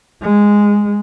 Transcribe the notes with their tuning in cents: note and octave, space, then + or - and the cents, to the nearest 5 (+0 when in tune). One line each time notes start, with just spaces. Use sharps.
G#3 -10